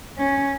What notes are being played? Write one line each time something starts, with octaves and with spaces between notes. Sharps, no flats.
C#4